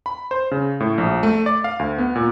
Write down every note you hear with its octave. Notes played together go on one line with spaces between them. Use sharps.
B5
C5
C#3
A2
A#1
A3
D5
F5
D2
B3
A#2